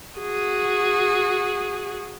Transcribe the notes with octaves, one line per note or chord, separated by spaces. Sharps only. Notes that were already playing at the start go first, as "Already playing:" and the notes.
F#4 G#4